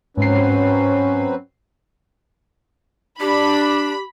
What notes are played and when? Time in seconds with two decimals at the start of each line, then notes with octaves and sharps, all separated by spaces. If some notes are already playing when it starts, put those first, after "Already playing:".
0.18 G#2 F#3 C4 C#4 B4 C7
3.20 D4 G4 B5